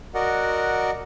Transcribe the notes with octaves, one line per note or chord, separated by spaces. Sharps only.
F#4 A#4 D5 D#5 F#5